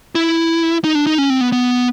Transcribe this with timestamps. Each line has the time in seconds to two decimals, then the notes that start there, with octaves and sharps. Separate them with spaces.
0.15 E4
0.84 D#4
0.95 D4
1.07 D#4
1.18 C#4
1.30 C4
1.41 B3
1.53 B3